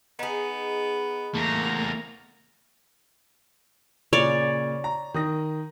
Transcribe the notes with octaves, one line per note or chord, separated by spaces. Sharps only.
B3 D#4 G#4
E2 A3 A#3 A#5
A#2 C#3 C#5 D5
A#5
D#3 D#6 A#6